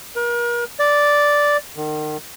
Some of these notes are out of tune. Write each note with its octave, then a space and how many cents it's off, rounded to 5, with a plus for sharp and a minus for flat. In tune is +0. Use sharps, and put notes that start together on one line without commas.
A#4 +40
D5 -5
D#3 -35